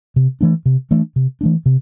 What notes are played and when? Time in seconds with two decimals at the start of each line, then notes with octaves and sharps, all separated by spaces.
0.16 C3
0.41 E3 A3 D4
0.66 C3
0.91 E3 A3 D4
1.16 C3
1.41 E3 A3 D4
1.66 C3